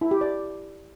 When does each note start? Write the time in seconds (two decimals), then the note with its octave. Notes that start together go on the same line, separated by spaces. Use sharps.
0.01 E4
0.11 G4
0.21 D5